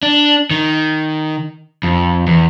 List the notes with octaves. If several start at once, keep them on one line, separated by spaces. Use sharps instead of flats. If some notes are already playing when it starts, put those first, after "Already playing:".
D4
D#3
F2
E2